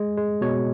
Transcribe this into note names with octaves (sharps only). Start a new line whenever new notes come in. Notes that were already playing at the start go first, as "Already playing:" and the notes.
Already playing: G#3
G#3
B2 C#5